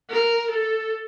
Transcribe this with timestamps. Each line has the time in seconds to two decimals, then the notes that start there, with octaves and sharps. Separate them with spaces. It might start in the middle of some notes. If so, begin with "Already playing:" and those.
0.10 A#4
0.51 A4